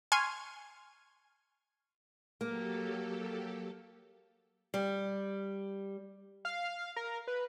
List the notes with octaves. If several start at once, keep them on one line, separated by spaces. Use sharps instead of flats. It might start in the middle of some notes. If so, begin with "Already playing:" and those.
G#5 C6 C#6 F6
F#3 A#3 G4 A4
G3
F5
A#4
B4